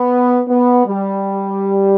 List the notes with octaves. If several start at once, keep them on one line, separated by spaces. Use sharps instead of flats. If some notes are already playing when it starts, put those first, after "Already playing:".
Already playing: B3
B3
G3